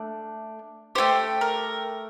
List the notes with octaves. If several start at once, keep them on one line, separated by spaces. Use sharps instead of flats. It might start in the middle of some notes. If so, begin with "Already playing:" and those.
Already playing: A3 D4
A3 E4 G4 C5
A#4